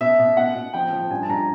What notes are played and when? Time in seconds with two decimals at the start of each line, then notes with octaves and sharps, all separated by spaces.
0.01 B2 E5
0.19 B2
0.37 B2 F#5
0.55 B2
0.74 F3 G5
0.93 F3
1.11 G2 G#5
1.23 A5
1.29 G2 A#5